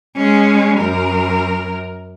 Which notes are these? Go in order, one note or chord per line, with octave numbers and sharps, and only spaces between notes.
G#3 C#4
F#2 A#4